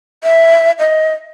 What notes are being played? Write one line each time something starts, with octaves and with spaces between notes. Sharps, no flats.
E5
D#5